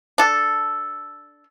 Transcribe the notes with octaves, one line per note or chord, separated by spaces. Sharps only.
D4 A4